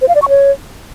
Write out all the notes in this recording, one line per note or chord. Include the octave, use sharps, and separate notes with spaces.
C5
F5
D5
C#6
C#5